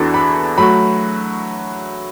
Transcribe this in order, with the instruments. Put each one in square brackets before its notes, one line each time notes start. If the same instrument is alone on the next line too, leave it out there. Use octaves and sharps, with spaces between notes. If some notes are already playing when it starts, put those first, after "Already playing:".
Already playing: [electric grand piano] E2 E3 D4 F#4 A4
[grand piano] B5
[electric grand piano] F#3 A3 F#4 [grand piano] B5